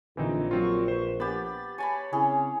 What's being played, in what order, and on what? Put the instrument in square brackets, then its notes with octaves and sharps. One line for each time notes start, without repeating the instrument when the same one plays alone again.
[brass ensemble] A#1 [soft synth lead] D3 [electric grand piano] E3 C4 D#4
[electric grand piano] F#3 C4 F4 [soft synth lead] C#6
[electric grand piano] B4 C5
[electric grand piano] B3 [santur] G4 B5 [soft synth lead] A6
[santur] C#5 A5 B5 [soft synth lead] G#5
[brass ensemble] C#3 C4 [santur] C#4 G#4 [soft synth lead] E4